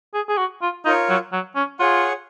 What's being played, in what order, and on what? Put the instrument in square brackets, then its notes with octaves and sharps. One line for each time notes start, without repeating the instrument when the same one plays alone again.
[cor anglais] G#4
G#4
F#4
F4
[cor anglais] D#4 [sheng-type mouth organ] F4 A#4 C#5
[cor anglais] F#3
F#3
C#4
[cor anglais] F4 [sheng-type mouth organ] G#4 C#5 F#5